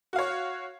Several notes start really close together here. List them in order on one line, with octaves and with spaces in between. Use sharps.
F#4 F5 C#5